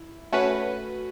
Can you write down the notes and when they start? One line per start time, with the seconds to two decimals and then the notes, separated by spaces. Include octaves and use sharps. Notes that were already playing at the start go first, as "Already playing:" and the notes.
Already playing: E4
0.32 A3 C#4 F#4 B4